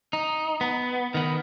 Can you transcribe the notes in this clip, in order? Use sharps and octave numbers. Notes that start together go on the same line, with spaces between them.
D#4
B3
D#3 B3